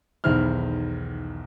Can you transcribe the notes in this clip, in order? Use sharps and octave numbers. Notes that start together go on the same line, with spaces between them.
B1 E2 D#3 E4 C5 F6